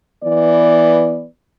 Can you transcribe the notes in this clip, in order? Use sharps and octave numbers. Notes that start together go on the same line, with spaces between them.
E3 B3 D5